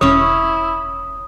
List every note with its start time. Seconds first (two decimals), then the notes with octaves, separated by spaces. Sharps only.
0.01 E1 C#4 E4 C#5 D#6